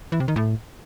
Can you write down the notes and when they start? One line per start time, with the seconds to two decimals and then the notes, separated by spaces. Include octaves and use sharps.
0.12 E3
0.20 C3
0.28 D#3
0.36 A2